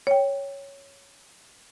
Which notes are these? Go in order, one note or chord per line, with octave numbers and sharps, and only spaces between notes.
C#5 G5